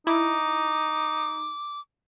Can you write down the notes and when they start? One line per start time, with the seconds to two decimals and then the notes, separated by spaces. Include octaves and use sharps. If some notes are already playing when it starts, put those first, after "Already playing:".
0.07 D#4 E4 D6